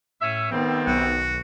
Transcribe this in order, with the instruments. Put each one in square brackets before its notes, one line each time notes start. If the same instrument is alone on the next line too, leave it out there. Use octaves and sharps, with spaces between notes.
[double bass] A2 [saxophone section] C#4 E5
[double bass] D#3 B3 [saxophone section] G3 A3 C4
[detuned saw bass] B1 [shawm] F#4